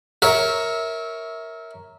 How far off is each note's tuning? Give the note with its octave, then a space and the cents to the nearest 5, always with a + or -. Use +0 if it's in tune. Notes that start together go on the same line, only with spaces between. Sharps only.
A#4 +0 C#5 +0 E5 -20